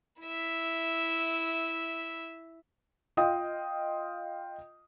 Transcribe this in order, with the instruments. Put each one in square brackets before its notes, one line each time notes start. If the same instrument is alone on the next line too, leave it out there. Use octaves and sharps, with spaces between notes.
[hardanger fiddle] E4 E5
[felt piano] F4 D#5 F5 G5 D#6